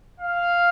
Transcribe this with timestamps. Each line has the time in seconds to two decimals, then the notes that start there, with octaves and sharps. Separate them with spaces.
0.20 F5